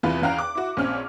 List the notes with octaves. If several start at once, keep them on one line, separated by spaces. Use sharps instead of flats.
E2 C3 E3 F4 B4
E2 C#4 F5 G5 A#5 F#6
D6
E4 F#4
A#1 C4 C#4 F6